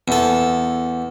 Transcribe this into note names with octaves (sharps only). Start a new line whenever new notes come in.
E2 A4